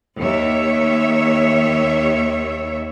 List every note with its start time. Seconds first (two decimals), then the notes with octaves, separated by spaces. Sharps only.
0.19 D#2 C#5 E5